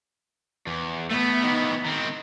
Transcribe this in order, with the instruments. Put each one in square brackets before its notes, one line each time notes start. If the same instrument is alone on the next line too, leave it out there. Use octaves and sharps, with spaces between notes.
[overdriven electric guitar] E2
[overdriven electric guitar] A3 [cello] B3
[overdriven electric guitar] D#3 E3
D#3 C4